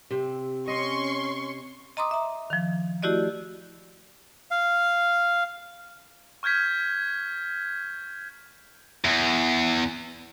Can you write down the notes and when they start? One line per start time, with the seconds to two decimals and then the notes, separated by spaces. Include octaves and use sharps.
0.11 C3 C4
0.68 C#4 D#5 C6 C#6
1.97 D#5 A#5 C6 D6 D#6
2.11 E5 A#5
2.50 D#3 F3
3.03 A3 E4 F#4 G4 D5 D#5
4.51 F5
6.43 C#6 F6 G6 G#6 B6
9.05 E2